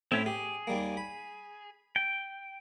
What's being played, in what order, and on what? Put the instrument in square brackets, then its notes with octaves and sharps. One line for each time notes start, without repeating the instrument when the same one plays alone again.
[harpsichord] A2 [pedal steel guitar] C4 C#4 E4
[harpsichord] G4 [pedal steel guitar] G#4
[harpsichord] D#2 G3 A#3
B5
[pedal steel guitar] G5